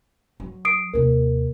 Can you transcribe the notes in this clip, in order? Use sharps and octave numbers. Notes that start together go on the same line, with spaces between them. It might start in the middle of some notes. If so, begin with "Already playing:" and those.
F#3
D#6 C7 D7
D#2 C3 A#4